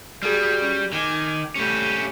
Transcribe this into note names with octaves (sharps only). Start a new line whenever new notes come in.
G3 F#4 G#4
C#4
D#3 G#5 D6
G3 A3 C#4 G4